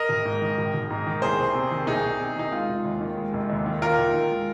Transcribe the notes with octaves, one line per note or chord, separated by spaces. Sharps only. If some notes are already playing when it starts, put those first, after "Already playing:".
Already playing: A#4 D#5
G#1
G#2
D#3
G#1
G#1
G#2
D#3
C2 G#4 C5
C2
C3
D#3
C2 D#4 G#4
C2
C3
D#3 D#4
G#3 F4
F1
D#2
D#3
G#3
F1
D#2
D#3
D#2 F4 A#4
D#2
D#3
G#3